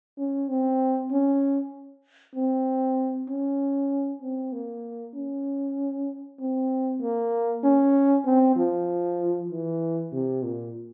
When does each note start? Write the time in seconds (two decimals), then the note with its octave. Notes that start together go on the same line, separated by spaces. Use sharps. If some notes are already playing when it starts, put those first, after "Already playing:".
0.18 C#4
0.49 C4
1.11 C#4
2.35 C4
3.29 C#4
4.22 C4
4.53 A#3
5.15 C#4
6.39 C4
7.01 A#3
7.63 C#4
8.25 C4
8.56 F3
9.49 E3
10.12 C3
10.43 A#2